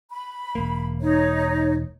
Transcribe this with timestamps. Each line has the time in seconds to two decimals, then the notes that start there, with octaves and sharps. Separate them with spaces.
0.10 B5
0.55 E1 A#3
1.00 D#4 C#5